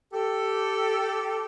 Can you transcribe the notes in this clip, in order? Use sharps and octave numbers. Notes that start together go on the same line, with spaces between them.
G4 A4